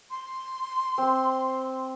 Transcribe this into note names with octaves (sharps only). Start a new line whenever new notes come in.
C6
C4